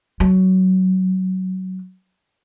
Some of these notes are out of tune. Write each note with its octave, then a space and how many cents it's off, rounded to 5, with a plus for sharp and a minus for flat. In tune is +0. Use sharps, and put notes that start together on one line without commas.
F#3 +15